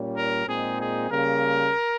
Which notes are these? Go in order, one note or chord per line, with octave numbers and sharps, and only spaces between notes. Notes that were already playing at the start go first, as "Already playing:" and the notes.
Already playing: A#2 G3 C#4
A#4
A#2 G#3 C4 D#4 G#4
G#4
C#3 G3 A#3 A#4